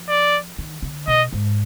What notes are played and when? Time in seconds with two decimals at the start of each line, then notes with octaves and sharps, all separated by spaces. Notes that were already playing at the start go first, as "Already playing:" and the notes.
Already playing: F3
0.09 D5
0.58 D#3
0.82 D3
1.07 B2 D#5
1.32 G#2